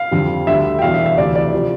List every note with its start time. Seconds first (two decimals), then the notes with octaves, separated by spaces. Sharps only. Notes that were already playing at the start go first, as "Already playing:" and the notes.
Already playing: F5
0.11 F2 D3 G3
0.47 D2 D3 G3 E5
0.79 G5
0.82 E2 B2 G3 F5
0.94 E5
1.06 E5
1.18 D2 C3 E3 D5
1.35 D5
1.54 C3 F3